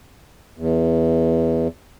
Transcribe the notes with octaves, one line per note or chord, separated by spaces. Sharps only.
E2